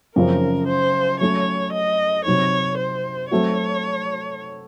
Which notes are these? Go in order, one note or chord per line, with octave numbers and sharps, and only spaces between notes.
F#2 C#3 F3 C4 F4 A#4
C5
F#3 A3 C#4 A4 C#5
D#5
C3 F#3 C4 D#4 C#5
C5
F#3 A3 C4 F#4 C#5